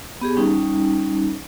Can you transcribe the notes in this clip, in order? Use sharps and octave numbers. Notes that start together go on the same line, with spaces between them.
B3 G4 G#4
G3 C#4 D#4